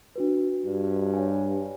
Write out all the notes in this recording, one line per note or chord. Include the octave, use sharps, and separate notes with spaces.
D4 F#4 B4
G2
C#5 F5 G#5